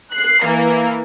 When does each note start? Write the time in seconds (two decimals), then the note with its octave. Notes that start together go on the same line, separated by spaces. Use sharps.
0.13 F#6 C7
0.44 E3 A#3